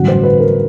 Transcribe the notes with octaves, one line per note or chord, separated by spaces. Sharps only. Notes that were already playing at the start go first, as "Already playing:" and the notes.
Already playing: A1 G2 D3 F#3 F#5
C5
B4
A#4